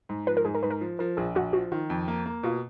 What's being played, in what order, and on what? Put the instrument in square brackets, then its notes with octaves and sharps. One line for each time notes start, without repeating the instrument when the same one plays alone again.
[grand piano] G#2
[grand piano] F3 [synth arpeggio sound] B4
[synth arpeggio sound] A#4
[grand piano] G#2 [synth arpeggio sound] G#4
[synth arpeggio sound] A#4
[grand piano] G#2 [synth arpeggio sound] B4
[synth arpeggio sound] A#4
[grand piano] F3
[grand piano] F3 [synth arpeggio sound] A#4
[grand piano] A#1 [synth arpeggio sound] G#4
[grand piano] A#1 [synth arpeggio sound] F#4
[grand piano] F3 [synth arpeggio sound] F#4
[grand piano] D#3 [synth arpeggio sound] F4
[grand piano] F2
A#3
A#3
[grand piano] B2 [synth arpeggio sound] F4